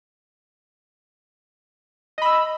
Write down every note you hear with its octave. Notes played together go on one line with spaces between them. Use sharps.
D#5 B5 E6